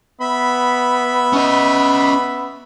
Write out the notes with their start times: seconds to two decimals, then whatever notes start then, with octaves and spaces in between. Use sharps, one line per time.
0.21 B3 E5 B5
1.33 C#4 D#5